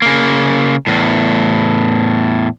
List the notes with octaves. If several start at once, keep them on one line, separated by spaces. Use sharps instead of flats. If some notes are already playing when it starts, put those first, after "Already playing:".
C#3 A#3
E2 A2